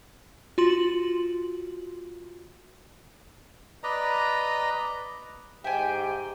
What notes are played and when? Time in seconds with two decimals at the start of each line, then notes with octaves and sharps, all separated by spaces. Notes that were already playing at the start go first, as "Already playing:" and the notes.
0.58 F4 F#4 C6 F#7
3.83 B4 D5 D#5 A#5
5.64 G#2 G4 E5 G5 G#5